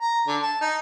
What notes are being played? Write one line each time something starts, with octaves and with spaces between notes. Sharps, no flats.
A#5
D3
A5
D#4